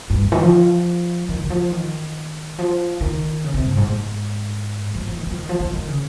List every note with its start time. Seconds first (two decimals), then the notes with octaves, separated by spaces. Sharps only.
0.10 G2
0.22 G2
0.32 D#3
0.43 F3
1.29 D#3
1.44 D#3
1.50 F3
1.71 D#3
2.59 F3
3.01 D#3
3.44 C#3
3.54 C3
3.66 G2
3.77 G#2
3.88 G#2
4.95 F3
5.07 F3
5.17 D#3
5.27 F3
5.37 D#3
5.49 F3
5.60 D#3
5.73 D#3
5.88 C#3